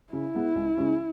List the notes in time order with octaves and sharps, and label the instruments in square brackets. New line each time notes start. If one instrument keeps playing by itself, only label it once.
[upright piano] C#3 [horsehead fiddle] E4
[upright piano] G#3 B3
C#2
C#3 G#3 C#4